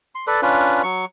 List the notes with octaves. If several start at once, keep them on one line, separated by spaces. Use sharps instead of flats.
C6
A4 B4 D5
C#4 D4 F4 B4
F#3 C#6